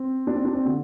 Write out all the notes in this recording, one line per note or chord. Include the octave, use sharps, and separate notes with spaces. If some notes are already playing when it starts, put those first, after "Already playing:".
Already playing: C4
D4
C4
D4
C4
D3